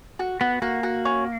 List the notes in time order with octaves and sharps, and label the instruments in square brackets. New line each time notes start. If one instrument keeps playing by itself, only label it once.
[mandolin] F#4
[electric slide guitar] B3 [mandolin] F#4
[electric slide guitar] A#3 [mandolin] F#4
[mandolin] F#4
C#4